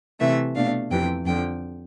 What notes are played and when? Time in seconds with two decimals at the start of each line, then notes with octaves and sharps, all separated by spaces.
0.19 C3 E3 A3 E5
0.55 B2 A3 D4 F5
0.91 F2 C3 E3 G5
1.25 F2 D3 F3 G5